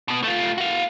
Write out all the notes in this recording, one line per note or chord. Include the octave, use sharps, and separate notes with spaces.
B2 B3
A3 F4
F#4 F5